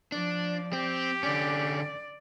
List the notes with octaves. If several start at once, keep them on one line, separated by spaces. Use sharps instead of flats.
F3 D4 D5
C4 G4
D3 C#4 D5